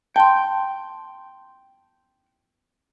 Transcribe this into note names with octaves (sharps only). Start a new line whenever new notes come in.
G5 A5 C6